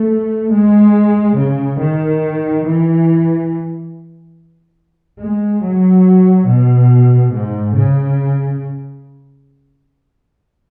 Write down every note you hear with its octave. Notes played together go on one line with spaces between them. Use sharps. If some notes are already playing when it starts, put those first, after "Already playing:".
Already playing: A3
G#3
C#3
D#3
E3
G#3
F#3
B2
G#2
C#3